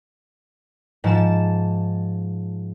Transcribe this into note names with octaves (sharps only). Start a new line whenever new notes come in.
G#2 F3 A5 E7